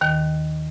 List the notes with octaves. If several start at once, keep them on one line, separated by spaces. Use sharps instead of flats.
D#2 D#3